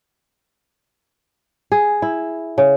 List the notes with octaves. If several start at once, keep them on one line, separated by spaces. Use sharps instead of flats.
G#4
E4
C#3